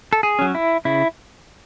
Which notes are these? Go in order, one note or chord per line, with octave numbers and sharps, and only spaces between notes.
A4
G#4
F#3 C#4
E4
C#3 E4